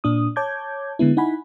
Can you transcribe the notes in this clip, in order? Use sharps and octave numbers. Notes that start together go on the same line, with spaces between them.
A#2 D4 D#6
C#5 A5 D6 G6 G#6
D3 G#3 B3 E4
D#4 E4 F#5 G#5 B5